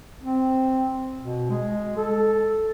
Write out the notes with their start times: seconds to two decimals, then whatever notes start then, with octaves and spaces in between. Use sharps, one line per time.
0.23 C4
1.19 B2
1.50 G#3
1.97 A4